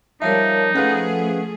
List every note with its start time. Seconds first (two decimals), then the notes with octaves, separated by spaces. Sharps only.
0.22 F3 G3 D#4 A#4 C#5 E5 F5 A5
0.75 F3 A3 C#4 G#4 A4 B4 F5 F#5